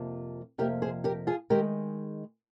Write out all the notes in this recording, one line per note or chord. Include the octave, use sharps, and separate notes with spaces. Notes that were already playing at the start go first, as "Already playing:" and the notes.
Already playing: F2 C3 F3 A#3
F2 C3 F3 A#3 G4 A#4
G#4 C5
G4 A#4
F4 G#4
D#3 G#3 G4 A#4